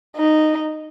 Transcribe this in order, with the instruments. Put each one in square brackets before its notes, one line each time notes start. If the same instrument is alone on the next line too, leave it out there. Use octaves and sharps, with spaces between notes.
[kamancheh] D#4